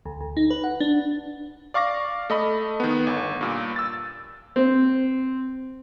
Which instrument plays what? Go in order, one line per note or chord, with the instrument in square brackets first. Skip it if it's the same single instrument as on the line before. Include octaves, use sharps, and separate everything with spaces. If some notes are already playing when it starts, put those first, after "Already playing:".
[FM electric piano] D2
D2
D#4
B4
F#5
D4
[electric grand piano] D5 F5 C#6 D6 A#6
A3 D#5 B5
D#3 B3
G1
G2 A#2
E6 A6
[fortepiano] C4